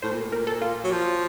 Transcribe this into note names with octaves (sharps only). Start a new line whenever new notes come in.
A2 C5
A#2
A2
A#2 A#4
A4
F4
F#3
F3